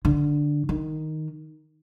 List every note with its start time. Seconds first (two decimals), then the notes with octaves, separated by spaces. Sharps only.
0.05 D3
0.69 D#3